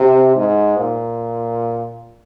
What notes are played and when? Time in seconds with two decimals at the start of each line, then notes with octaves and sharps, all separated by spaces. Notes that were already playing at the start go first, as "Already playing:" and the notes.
Already playing: C3
0.35 G#2
0.77 A#2